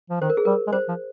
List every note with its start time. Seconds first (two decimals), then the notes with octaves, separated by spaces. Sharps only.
0.10 F3
0.21 D#3 C5
0.30 A#4
0.37 G#4
0.45 G3 A#4
0.67 G#3
0.72 G3 C5
0.88 F3